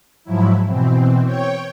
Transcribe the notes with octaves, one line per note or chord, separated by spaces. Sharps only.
G#2 F3 F#3 E4
B2 E3 C4
C#5 G5